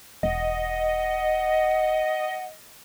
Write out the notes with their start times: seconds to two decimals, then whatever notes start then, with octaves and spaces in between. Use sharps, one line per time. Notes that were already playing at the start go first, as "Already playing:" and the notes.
0.23 E1 D#5 F#5